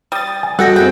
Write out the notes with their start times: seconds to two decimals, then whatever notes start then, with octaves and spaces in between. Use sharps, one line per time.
0.12 G3 D#6 A6
0.43 G#5
0.59 G3 F#4 A4 D#5 F#5 G5 E6 A#6
0.76 C4 E4 G#4 G5